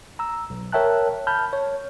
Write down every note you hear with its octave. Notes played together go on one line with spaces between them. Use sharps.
A#5 E6
B1
A#4 C#5 E5 G5 A5 F#6
A5 B5 F6 G6
C#5